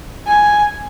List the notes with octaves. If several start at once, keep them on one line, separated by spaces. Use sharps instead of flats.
G#5